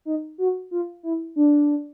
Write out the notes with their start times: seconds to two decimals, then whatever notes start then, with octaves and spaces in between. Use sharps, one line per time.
0.05 D#4
0.38 F#4
0.71 F4
1.03 E4
1.36 D4